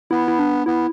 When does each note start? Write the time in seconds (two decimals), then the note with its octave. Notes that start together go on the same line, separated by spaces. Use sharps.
0.11 B3 E4
0.28 E4
0.39 D4
0.66 B3 E4